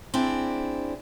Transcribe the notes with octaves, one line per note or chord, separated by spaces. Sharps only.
C4 D4 E4 G#4